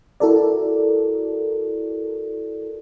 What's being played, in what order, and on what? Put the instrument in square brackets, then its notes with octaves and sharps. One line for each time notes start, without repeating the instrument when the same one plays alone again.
[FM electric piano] E4 F#4 A4 A#4 D5